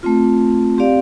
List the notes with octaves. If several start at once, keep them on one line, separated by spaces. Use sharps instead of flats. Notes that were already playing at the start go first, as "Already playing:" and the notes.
A3 C4 F4
C4 G4 D5 F5